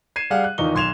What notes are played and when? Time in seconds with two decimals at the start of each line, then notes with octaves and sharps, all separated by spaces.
0.16 G#6 C7 D#7 E7
0.30 G3 G#4 F5 F#5
0.44 F#6
0.58 E2 D#3 D#4 F4 C#6 G7
0.75 B1 C6 G#6 E7 F7